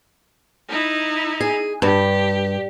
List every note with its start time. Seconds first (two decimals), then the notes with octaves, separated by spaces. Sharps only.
0.68 D#4 E4
1.41 G#4
1.82 G2 G4